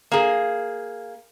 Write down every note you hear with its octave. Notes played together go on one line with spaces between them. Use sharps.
A#3 G#4